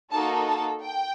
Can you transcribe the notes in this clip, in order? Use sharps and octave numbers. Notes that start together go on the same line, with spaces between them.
A#3 D#4 F#4 A4 A5
A5
G5